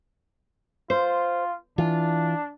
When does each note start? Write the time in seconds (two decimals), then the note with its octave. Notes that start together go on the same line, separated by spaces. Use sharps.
0.90 F4 C5
1.78 E3 D4 F4